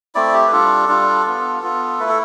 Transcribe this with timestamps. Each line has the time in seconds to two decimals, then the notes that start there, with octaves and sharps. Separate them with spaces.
0.15 A3 C4 E4 D5
0.34 G4
0.48 B4
0.52 G3 D4 F4 A4
0.88 G3 D4 F4
1.26 B3 F4
1.62 B3 F4
1.99 A3 E4 B4
2.09 A4